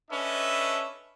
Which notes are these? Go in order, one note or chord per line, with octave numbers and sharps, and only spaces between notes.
C#4 D4 A4 B4 D#5 E5